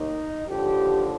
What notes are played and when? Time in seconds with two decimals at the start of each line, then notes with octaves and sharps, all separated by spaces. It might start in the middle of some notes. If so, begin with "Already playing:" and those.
Already playing: D#2 D#3 D#4
0.48 D#2 D3 F3 G4